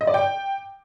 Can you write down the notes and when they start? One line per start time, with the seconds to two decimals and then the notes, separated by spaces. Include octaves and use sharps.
0.01 D#5
0.07 D5
0.14 G5